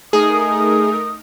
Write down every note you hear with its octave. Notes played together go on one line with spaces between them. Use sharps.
A3 D#4 G#4 A#4 D#6